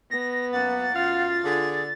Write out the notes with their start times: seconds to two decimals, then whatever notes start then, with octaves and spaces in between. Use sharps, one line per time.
0.11 B3 A#6
0.53 F#2 A#3 F#5 A6
0.94 F#2 F4 F5
1.44 D3 G#4